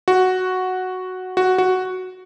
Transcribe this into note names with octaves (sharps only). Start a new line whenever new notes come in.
F#4
F#4
F#4